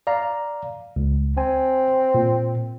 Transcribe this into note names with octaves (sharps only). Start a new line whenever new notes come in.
D5 F5 A#5
C#2
C4 G#5
A#2